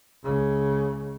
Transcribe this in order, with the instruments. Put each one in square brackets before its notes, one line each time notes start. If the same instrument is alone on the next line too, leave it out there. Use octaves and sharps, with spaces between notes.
[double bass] C#2 C#3